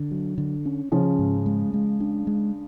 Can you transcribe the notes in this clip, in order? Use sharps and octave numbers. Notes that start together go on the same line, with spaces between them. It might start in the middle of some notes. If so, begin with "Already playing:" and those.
Already playing: D3
F#3
D3
C#4
C#3 F3 C#4
G#2
G#3
G#3
D4
G#3